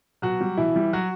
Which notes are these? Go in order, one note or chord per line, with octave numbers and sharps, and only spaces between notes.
B2 F#3 F#4
G3
B2 E3 E4
G3
F#3 F#4